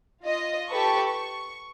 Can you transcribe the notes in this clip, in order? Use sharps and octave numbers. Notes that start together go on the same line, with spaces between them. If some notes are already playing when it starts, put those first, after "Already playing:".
F4 D#5
G4 A4 B4 C#6
C#6